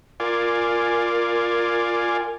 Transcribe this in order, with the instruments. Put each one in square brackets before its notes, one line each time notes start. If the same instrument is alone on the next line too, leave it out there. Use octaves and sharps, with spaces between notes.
[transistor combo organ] F4 D5 [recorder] A#4 [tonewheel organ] G#5